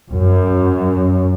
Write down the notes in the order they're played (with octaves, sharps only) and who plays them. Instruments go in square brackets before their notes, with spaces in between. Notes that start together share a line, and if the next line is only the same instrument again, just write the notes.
[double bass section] F#2